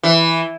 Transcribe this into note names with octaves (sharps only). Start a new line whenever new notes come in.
E3